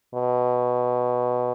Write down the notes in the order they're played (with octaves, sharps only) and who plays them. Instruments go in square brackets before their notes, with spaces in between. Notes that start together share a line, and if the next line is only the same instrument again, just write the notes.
[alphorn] B2